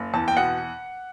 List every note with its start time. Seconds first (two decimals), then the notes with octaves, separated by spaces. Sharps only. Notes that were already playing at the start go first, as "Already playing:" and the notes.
Already playing: F#1
0.14 E2 A5
0.28 G5
0.37 B2 F#5